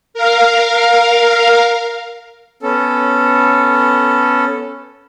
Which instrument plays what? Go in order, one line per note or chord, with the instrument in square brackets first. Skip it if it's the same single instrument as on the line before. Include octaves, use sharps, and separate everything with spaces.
[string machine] A#4 F5
[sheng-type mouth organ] B3 C#4 A4